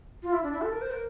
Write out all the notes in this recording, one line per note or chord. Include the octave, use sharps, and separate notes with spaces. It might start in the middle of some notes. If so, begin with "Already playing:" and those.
F4
E4
D4
E4
A4
A#4
C5
A#4